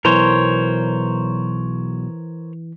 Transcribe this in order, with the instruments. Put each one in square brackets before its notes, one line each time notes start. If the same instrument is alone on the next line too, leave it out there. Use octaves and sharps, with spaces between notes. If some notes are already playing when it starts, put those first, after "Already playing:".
[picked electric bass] B2 F#3 [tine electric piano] E3 [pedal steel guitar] A#4 C5 C#5